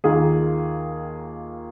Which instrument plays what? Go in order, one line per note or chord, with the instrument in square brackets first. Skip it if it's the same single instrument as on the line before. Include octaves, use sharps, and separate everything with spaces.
[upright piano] D#2 D#3 A#3 F4 G#4